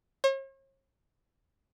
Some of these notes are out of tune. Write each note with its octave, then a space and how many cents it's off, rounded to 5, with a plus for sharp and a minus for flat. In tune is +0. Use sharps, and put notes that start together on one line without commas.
C#5 -45